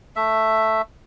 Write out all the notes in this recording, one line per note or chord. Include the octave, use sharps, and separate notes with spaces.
A3 E5